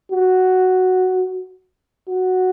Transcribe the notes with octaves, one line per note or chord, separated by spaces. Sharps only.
F#4
F#4